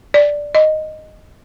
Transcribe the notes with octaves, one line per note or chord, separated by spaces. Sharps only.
D5
D#5